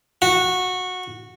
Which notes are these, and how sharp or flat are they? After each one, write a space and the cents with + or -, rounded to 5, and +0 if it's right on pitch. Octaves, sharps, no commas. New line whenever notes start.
F#4 -15